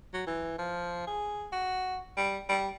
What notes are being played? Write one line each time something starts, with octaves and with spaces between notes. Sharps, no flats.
F#3
E3
F3
G#4
F#4
G3
G3